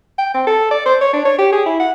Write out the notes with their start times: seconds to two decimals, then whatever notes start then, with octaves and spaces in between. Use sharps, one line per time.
0.18 G5
0.34 C4
0.47 A4
0.71 D5
0.86 C5
1.01 C#5
1.13 D4
1.25 C#5
1.38 G4
1.52 G#4
1.66 E4
1.80 F#5